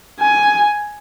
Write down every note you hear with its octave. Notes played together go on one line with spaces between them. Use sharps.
G#5